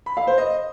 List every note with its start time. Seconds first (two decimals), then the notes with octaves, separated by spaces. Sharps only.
0.06 B5
0.17 F5
0.27 C5
0.38 D#5